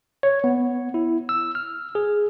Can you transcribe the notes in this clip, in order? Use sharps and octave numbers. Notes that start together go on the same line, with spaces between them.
C#5
B3
E4
E6
F6
G#4